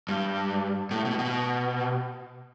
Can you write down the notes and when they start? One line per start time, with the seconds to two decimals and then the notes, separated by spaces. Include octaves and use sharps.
0.09 G2
0.91 A2
1.05 B2
1.19 B2